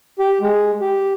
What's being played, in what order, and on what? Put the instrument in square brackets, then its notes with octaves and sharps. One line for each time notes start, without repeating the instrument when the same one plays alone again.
[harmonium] G4
G#3
G4